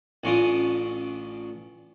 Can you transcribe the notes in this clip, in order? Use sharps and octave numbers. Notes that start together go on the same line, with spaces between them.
A1 C#4 D4 F4 D#6